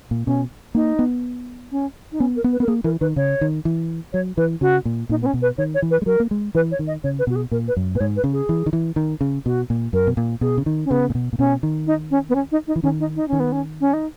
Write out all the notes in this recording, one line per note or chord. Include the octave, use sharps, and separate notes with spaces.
A#2
B2 C#4
A#3 D#4
B3
C#4
D#4
B3 C#4
A#4
B3
B4
B3 A#4
A#3 G#4
E3 A#4
D#3 B4
C#3 C#5
D#3
E3
F#3 C#5
E3 B4
C#3 F#4
A#2
A#2 D#4
B3
C#4
B2
B4
D#3 C#5
C#5
E3
B4
G#3
F#3 A#4
A#3
G#3
E3 B4
C#5
D#3
D#5
C#3 C#5
B4
B2 F#4
G#4
A#2 A#4
B4
F#2
A#2 B4
G#2 C#5
B4
C#3
G#4
E3
D#3
E3
D#3
C#3
B2 F#4
A#2
F#2 A#4
B2
A#2
B2 G#4
C#3
D#3
C#4
C#3 B3
A#2
B2
A#2
B2 C#4
D#3
D#4
C#4
B3
C#4
D#4
D#4
E3
D#3 C#4
D#4
D#4
D#3 C#4
B3
C#4
C#4
D#4